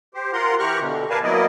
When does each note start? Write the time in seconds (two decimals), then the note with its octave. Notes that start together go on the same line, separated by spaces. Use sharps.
0.14 G4 C5
0.33 F4 A#4 F#5 A#5 C6
0.59 E3 G4 A#5 C#6 F6 F#6
0.80 B2 D3
1.10 A#4 B4 D5 F5 G#5 A5
1.24 F#3 A#3 B3 E4 D5 D#5